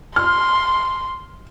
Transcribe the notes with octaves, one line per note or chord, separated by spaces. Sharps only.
C6 F6